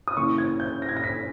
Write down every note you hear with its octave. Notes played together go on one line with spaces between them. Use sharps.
D#6
C#3 E3 A#3 C#6
G#6
G6
A#6
G#6
A#6
B6